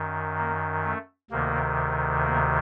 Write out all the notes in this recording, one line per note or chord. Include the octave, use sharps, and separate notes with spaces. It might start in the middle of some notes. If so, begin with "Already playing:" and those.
Already playing: F#2 D#3
A#3
A3
D2 C3 D#3 A#3
A#3